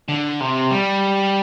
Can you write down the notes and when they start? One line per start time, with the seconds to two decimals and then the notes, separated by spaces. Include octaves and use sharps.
0.08 D3
0.40 C3
0.71 G3